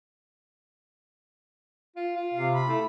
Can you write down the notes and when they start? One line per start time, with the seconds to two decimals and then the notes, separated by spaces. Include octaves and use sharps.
1.96 F4
2.17 F4
2.34 C3 F5
2.53 B5
2.68 A3 E4